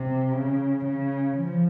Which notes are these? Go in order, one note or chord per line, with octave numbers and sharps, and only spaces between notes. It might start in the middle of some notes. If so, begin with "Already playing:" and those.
Already playing: C3
C#3
C#3
F3